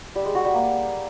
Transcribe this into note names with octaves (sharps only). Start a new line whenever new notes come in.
G3
G#3
F#4
G3
A#3